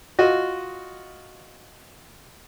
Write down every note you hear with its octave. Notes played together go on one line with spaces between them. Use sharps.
F4 F#4 D#5